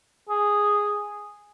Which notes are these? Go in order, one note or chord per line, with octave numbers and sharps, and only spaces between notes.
G#4